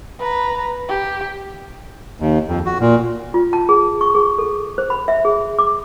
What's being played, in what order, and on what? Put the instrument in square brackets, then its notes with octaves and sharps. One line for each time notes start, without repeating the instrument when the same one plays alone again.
[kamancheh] B4 A#5
G4
[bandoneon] D#2
F2
F#4
A#2
[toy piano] F4
A5
G#4
C#6
G#4
A4
C5
B5
E5
G#4
D6